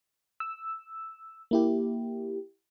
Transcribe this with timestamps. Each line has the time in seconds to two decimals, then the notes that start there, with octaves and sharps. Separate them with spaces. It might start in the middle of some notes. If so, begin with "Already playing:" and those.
0.40 E6
1.51 A#3 E4 G4